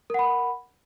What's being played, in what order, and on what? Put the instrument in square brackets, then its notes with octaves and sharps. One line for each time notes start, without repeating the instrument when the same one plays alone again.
[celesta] A#4
F#5
B5